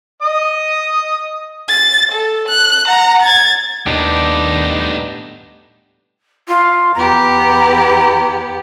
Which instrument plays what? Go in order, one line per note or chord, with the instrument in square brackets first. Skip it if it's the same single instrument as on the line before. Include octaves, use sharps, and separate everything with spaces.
[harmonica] D#5 D#6
[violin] A6
A4
F#6
F#5 A#5
G#6 A6
[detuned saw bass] D#2 [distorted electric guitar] A2 G3 [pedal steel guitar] B3 D4 G4 [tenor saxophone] D#4
[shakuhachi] F4
[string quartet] E2 B3 G4 [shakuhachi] A#5